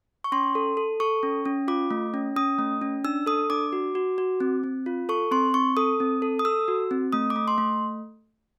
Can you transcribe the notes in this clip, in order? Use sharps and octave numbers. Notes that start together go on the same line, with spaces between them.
C#6
C#4 C6
A4
A4
A4 C#6
C#4
C#4
F4 D6
A3
C#4
C#4 D#6
A3
C#4
D4 E6
A4 D#6
D4 D6
F#4
F#4
F#4
C4
C4
F4
A4 C#6
C4 C6
C4 C#6
A4 D#6
C4
A4
D#6
A4 E6
F#4
C4
A3 D#6
D6
A3
C6
A3